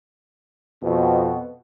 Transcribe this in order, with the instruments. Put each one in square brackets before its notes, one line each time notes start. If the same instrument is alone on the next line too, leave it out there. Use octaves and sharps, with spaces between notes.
[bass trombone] F2 [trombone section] B2